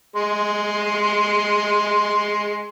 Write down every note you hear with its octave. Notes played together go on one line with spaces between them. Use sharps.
G#3 C6